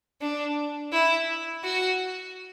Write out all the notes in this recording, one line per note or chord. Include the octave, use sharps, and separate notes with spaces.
D4
E4
F#4